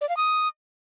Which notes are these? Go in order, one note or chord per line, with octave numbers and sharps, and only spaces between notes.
D5
F5
D#6